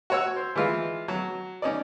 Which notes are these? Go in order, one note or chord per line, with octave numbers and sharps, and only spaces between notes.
F#4 C#5 E6
C5
E3 G#3 F4
F#3
C#4 D#4 D5